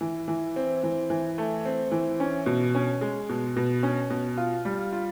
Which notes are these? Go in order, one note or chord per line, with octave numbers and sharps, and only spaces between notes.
E3
E3
C4
E3
E3
A3
C4
E3
C#4
B2
C#4
G#3
B2
B2
C#4
B2
F4
G3
F4